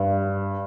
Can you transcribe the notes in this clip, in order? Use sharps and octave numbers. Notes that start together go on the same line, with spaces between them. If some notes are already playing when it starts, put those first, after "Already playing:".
Already playing: G2